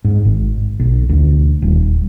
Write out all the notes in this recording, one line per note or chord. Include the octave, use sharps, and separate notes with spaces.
G#2
G#1
B1
D2
D#1